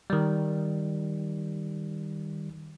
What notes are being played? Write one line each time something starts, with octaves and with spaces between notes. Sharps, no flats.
D#3 G3